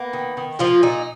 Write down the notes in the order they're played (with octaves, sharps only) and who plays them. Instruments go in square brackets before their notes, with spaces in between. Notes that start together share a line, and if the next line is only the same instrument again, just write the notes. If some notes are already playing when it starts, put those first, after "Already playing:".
Already playing: [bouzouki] A#3 B3
D#3
D#3
F3 A#3 F4
A#2 D#4